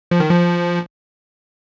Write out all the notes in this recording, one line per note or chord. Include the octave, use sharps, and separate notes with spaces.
F3
D#3
F3